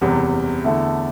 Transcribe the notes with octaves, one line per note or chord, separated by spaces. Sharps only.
F#1 E2 C3 G3
E2 D3 A3 E4 A4